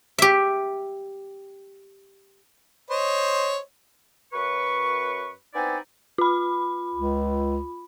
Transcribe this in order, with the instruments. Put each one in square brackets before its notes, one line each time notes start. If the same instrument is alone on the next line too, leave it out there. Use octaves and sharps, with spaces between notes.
[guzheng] G4 E5
[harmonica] C5 C#5 D#5
[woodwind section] F#2 B4 C#6
B3 C4 D#4 E4 D5 G#5
[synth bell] F4 B5
[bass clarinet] C#2